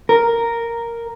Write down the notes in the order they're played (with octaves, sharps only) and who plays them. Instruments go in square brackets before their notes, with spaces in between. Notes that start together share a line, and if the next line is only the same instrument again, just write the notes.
[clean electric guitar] A#4